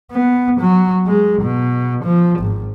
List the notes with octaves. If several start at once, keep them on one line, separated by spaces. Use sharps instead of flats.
B3
F#3
G#3
B2
F3
G#1